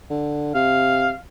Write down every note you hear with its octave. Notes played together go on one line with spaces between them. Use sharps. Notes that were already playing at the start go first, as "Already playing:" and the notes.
D3
C3 F5